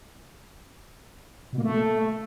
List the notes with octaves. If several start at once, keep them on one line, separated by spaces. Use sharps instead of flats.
B2
A#3
A3